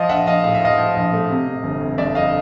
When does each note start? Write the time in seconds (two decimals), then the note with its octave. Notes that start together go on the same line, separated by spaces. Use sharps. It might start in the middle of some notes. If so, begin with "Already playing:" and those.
Already playing: F3 D#5 F5
0.09 A#1 E5 F#5
0.26 A#1 D#5 F5
0.44 A2 F5
0.55 E5
0.61 F3 D#5 F5
0.78 F3
0.96 A#1
1.13 A3
1.30 C3
1.47 C3
1.64 G1
1.81 F2
1.98 G1 D5 E5
2.15 F2 D#5 F5